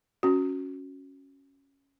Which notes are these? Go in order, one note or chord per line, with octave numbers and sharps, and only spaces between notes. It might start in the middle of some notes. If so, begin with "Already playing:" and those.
C#4 F#4